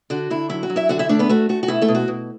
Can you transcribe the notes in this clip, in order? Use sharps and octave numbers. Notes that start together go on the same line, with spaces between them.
D3 F#4
D3 E4
F#3 E4
F#4
F#3
E4 E5
D3 F#4 F#5
E4 E5
A3 D4 D5
B3 B4
A3 F#4
A3 F#4
F#4
B2 E4
A3 A4
B2
F#4
B2